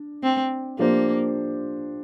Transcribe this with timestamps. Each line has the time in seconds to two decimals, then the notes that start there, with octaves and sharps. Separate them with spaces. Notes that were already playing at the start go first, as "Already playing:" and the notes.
Already playing: D4
0.23 C4
0.79 F3 A#3 D4 G4 C5